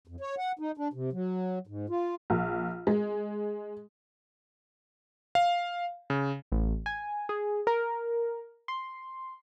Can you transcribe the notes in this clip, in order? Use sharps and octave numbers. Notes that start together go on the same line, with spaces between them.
F2
C#5
F#5
D#4
D4
C3
F#3
G#2
F4
A#1
G#3
F5
C#3
A1
G#5
G#4
A#4
C6